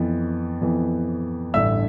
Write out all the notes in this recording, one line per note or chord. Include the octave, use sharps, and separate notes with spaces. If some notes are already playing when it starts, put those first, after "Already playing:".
Already playing: F2 E3 B3
F2 E3 B3
A1 G2 D3 E5 E6